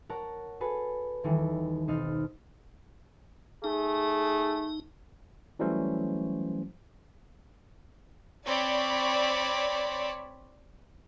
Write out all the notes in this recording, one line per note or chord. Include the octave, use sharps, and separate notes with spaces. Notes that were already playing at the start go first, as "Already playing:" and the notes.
A#4 C#5 F#5 A5
F#4 G#4 A4 B4
D#1 D#3 E3 A4
B1 C4 D#4 C6 F6 A6
A3 D#4 G#4
E3 F#3 G3 A3 C#4 C5
C4 C#5 D5 B5